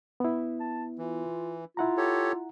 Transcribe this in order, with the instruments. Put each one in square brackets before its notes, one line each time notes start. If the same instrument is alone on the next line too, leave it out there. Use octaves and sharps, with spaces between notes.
[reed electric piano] B3 E4
[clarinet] A5
[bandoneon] E3 [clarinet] F4
[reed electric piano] E4 F#5 A#5 [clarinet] F4
[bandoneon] G4 A4 C#5